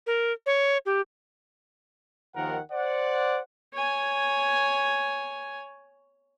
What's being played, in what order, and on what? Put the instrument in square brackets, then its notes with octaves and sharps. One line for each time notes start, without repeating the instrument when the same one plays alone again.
[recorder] A#4
C#5
G4
[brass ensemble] D#2 D#3 F3 A#4 F#5
C5 D5 F#5
[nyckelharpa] C#5 G#5